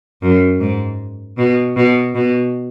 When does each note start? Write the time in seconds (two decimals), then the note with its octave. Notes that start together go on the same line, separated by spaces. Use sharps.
0.22 F#2
0.60 G#2
1.38 B2
1.76 B2
2.15 B2